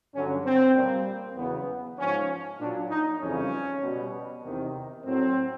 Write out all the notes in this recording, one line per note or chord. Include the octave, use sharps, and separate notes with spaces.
G2 D3 F#3 C#4
C4
A#2 G3
E2 C#3 F#3 B3
G#2 F3 C#4
A#2 F#3 D4
D#4
F2 C#3 E3 G3 C#4
B2 G3
E2 C3 D#3
A2 F#3 C4